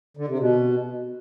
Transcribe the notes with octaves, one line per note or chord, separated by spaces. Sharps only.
D3
C3
B2